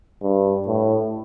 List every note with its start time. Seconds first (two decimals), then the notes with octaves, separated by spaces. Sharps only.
0.22 G2
0.67 A2